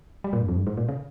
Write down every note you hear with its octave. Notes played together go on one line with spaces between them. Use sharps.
G3
A#2
G2
F2
G2
G#2
A#2
C#3